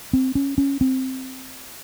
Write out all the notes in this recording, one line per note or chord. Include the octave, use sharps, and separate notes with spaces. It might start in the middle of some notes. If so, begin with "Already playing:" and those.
C4
C#4
C#4
C4